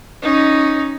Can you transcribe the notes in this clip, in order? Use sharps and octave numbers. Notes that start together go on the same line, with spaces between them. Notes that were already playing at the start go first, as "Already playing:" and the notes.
C#4 D#4